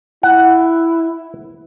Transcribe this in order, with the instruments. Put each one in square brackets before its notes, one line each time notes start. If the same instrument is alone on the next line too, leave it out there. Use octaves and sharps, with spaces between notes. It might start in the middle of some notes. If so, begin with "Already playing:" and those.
[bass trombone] E4 [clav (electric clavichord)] F#5